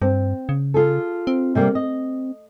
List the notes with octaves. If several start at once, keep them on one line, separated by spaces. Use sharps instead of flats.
G2 C4
C#3
F4 G#4 A4
C4
C3 G3 A#3
D#5